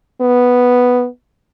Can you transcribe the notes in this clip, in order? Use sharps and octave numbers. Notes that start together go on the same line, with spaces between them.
B3